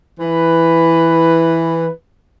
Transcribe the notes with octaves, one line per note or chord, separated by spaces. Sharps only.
E3 B4